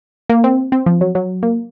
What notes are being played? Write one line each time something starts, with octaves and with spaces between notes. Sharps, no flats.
A#3
C4
C4
F3
F#3
F#3
A#3